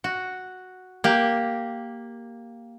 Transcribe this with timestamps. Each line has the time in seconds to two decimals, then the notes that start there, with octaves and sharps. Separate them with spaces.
0.04 F#4
1.04 A#3 G4